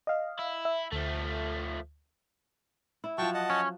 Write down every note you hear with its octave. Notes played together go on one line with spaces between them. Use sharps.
D#5 F5
E4
E5
D2 F3 A3
E4
F3 F#3 G5 A5 C#6
D#5 F#5 A5
C#4